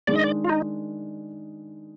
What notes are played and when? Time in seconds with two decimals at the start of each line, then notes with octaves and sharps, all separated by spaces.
0.07 D#3 G#3 D4 G#4 D5
0.16 D#5
0.24 D5
0.44 F4
0.49 D#4